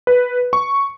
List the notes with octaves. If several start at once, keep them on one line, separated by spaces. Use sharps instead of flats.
B4
C#6